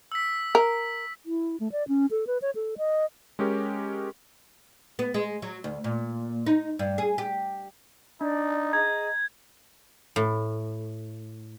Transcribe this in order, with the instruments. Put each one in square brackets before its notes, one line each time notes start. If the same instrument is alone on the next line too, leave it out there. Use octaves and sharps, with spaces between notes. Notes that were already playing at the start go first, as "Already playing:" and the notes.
[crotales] E6 B6
[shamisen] A#4
[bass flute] E4
A3
D5
C#4
A4
B4
C#5
A4
D#5
[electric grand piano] G#3 C#4 G4 A#4
[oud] B3
G#3
F#3
D2
A#2
D#4
G2
G#4
G4
[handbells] D4 [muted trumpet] D#4 [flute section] D5
[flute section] G#4 D#5 [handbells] A#5 [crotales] G#6
[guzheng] A2